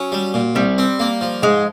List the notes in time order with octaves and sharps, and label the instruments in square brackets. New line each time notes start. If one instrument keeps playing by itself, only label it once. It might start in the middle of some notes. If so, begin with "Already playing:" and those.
Already playing: [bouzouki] F#3 [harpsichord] C#4
[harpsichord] G3
A#2
[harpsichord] C2 [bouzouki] G3
[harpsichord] C4
A#3
F3
[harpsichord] G#2 [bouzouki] G#3